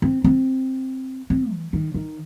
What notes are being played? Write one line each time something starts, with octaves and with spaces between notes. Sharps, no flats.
C4
C4
C4
E3
D#3
D#3